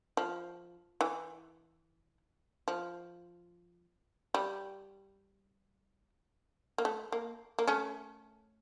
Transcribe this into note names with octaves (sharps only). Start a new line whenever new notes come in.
F3
E3
F3
G3
A#3
A3
A#3
A#3
A3 C#4